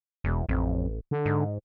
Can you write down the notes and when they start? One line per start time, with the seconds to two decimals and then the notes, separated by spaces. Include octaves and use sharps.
0.24 E1 E2
0.49 A1 F2
1.11 D3
1.25 G#2